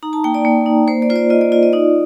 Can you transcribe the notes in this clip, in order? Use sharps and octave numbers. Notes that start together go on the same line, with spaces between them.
D#4 A#5
A5
A#3 G5
D5
A#3
D#4
A#3 C5
D5
F4 C5
D5
F4 D#5
D5
F4 D5
D#5
D#4 D5